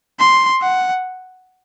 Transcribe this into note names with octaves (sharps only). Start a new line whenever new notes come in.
C6
F#5